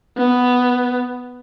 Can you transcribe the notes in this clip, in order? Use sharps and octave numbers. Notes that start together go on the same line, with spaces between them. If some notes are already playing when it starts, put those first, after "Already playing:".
B3